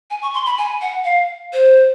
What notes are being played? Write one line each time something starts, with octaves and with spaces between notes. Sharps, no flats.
G#5
C#6
C6
B5
G#5
F#5
F5
C5